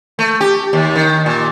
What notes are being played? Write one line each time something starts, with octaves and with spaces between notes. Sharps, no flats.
A3
G4
D#2
D#3
A#2